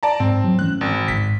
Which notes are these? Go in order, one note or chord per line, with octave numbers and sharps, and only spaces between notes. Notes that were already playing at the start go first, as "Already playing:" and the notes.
D5 A5 A#5
G#2 C4
F#3
E3 A3 C#4 F#6
G#1
G#1 G#2 B6